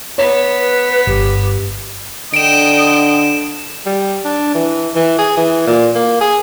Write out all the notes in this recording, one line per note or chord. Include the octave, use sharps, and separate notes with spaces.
B3 C#5
B4
G1 G4
D3 D#5 G5 D7 E7
G3
D4
E3
E3
G#4
E3
A#2
A#3
G#4